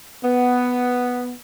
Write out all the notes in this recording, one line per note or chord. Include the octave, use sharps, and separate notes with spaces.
B3